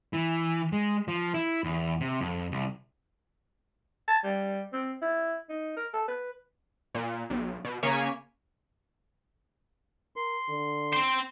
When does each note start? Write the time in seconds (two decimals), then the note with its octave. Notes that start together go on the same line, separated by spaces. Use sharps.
0.13 E3
0.72 G#3
1.08 F3
1.34 E4
1.64 E2
2.00 C3
2.21 F2
2.52 C2
4.08 A5
4.24 G3
4.73 C4
5.02 E4
5.49 D#4
5.76 A#4
5.93 A4
6.08 B4
6.95 A#2
7.30 B1
7.65 B2
7.83 C#3 A#3 C#5 G#5 B6
10.16 A#4 C6
10.49 D3
10.93 C4 C5